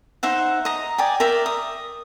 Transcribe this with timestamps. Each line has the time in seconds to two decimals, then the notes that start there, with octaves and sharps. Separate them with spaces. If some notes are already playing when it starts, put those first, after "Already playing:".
0.23 D#4 C5 E5 F#5
0.65 D#5 A#5
0.98 D5 G5 G#5
1.20 A#4 D5 E5 G5
1.46 D#6